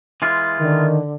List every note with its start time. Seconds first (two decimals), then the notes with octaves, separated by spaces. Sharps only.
0.22 E3 G#3 F4
0.60 D3 D#3